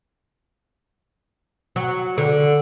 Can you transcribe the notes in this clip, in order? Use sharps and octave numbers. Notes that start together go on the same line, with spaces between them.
F#3
D3